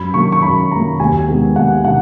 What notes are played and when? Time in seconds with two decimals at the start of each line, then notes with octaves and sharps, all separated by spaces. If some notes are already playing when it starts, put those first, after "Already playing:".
Already playing: F#2 B5
0.14 D#3 F#3 A#3 C#6
0.32 C#6
0.43 F#2 B5
0.71 D#3 F#3 A#3 A#5
1.00 D#2 G#5
1.28 D#3 G#3 B3
1.56 D#2 F#5
1.85 D#3 F#5